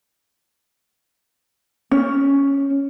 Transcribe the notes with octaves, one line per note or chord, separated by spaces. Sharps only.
C#4